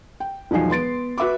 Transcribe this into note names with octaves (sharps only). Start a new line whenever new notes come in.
G5
E1 F3 F#3 D#4 G#5 C7
B3 C6 A6 D7
F#4 B4 E5 B5 D6